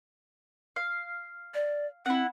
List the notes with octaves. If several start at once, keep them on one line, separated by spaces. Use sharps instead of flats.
F5
D5
C4 E4 F#5